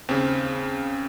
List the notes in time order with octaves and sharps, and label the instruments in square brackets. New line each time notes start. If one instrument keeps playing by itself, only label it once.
[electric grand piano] D#2 C#3 C4